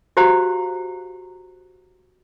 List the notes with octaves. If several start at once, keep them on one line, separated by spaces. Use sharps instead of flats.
F#4 G4 C5 F5 A#5